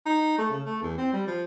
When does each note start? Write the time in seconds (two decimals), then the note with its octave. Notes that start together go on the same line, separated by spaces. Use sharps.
0.06 D#4
0.38 A3
0.50 C#3
0.65 A3
0.82 E2
0.98 C4
1.13 G3
1.27 F3